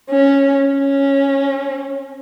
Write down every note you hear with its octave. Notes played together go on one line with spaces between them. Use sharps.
C#4
C#4